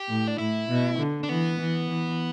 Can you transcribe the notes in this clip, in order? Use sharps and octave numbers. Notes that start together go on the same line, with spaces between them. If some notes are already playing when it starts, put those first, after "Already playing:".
Already playing: G4
A2
D4
A2 E4
B2
D3
D4
E3 B3
E3
E3